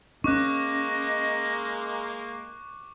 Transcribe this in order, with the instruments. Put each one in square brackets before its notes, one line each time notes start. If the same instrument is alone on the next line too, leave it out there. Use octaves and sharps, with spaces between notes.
[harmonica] G#3 A#3 [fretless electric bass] C#4 D4 [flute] D#5 [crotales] C#6 D6 F#6